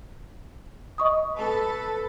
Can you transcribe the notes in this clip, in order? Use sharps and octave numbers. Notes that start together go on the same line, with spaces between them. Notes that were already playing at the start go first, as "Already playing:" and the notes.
D#5 C#6 D#6
A4 B4